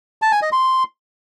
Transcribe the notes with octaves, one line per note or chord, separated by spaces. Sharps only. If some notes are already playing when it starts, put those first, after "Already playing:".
A5
G#5
D#5
C6